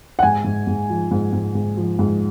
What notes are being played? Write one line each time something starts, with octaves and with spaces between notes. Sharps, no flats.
F#5
G#2 G#5
G#2
G#2
F3
G#2
G#2
G#2
F3
G#2